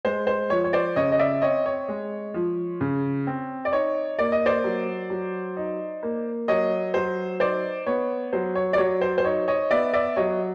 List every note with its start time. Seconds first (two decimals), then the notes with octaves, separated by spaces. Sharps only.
0.05 G#3 C5
0.27 C5
0.50 F3 C#5
0.64 C#5
0.73 C5 D5
0.96 C#3 C#5 D#5
1.12 D#5
1.19 D5 E5
1.42 C4 C#5 D#5
1.66 C#5
1.88 G#3
2.34 F3
2.81 C#3
3.27 C4
3.65 D5
3.72 D#4 C#5
4.18 A#3 D5
4.32 D#5
4.46 C5 D5
4.64 F#3
5.10 F#3
5.57 D#4
6.03 A#3
6.48 F#3 C#5 D#5
6.94 F#3 C5
7.40 D#4 C5 D5
7.86 B3 C#5
8.33 F#3 C5
8.55 C#5
8.73 D5
8.78 F#3 C#5
9.01 C5
9.18 C5
9.24 D#4 C#5
9.48 C#5 D#5
9.70 B3 D5 E5
9.93 D5 E5
10.16 F#3 C#5 D#5